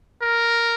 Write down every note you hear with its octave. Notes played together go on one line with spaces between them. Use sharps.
A#4